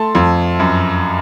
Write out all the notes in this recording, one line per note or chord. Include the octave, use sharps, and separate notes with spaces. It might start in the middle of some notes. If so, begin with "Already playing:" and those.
Already playing: A3 A5 C6
F2
F#2